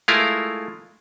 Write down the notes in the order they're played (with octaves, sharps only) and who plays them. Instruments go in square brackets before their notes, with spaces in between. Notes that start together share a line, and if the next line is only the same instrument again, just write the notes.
[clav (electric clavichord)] G#3 A3 E4 F4 A#4